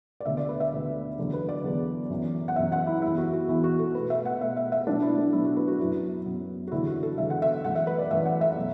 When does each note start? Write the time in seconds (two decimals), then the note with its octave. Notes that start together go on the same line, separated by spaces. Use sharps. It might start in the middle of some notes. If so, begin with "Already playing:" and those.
0.20 D5
0.25 D2 D3 B3 E5
0.37 D5
0.49 B4
0.60 E5
0.72 D2 D3 B3
1.18 E2 D3 F#3 B3
1.33 B4
1.49 D5
1.64 E2 D3 F#3 B3
2.10 F#2 E3 B3
2.48 F#5
2.56 F#2 E3 B3 E5
2.72 F#5
2.87 E4
3.02 E2 E3 B3 E4
3.18 F#4
3.33 F#4
3.49 E2 E3 B3 E4
3.64 F#4
3.79 A4
3.94 B2 A3 B4
4.10 E5
4.25 F#5
4.41 B2 A3 E5
4.57 E5
4.72 E5
4.87 B2 F#3 A3 D4
5.02 E4
5.18 D4
5.33 B2 F#3 A3 E4
5.45 F#4
5.57 B4
5.68 F#4
5.79 F#2 F#3 B3 E4
6.26 F#2 F#3 B3
6.68 F#4
6.72 E2 D3 F#3 B3 E4
6.87 F#4
7.03 A4
7.18 E2 D3 F#3 B3 E5
7.30 F#5
7.42 E5
7.64 F#2 E3 A3 F#5
7.75 E5
7.87 B4
7.99 D5
8.10 F#2 E3 A3 E5
8.26 F#5
8.41 E5
8.57 B2 F#3